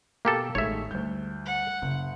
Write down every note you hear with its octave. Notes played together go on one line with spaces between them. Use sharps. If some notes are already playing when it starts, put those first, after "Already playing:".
B2 A#3 G4 A4
A1 D#3 G#3 A3 C#5 E5
D2 G3 G6
F#5
F#1 C#3